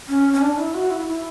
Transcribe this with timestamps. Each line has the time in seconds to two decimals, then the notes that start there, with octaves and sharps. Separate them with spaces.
0.09 C#4
0.33 C#4
0.42 D4
0.58 E4
0.74 F#4
0.91 E4
1.07 E4